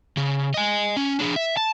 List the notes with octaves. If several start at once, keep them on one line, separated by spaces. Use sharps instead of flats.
C#3
D#5 G#5
C#4
D4 G#4
E5
A5